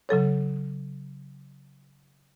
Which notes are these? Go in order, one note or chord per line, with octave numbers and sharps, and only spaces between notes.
C#3 F#3 A4 C#5